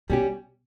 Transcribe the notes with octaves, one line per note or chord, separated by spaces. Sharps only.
B2 G3 C#4 G4